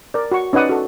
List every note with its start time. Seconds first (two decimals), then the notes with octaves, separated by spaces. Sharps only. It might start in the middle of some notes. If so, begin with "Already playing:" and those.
0.14 A#4 D5
0.31 F#4 C#6
0.53 C#4 D#4 B4 D5 F#5 D#6
0.69 F#4 A4